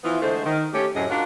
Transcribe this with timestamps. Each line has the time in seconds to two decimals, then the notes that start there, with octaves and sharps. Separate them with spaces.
0.04 E3 F3 B3 E4 F4
0.22 D3 G#3 A3 C5
0.45 D#3
0.73 A3 C#4 G4
0.95 F#2 A2 C3 G#4 D#5
1.10 D4 F4 F#4 A#4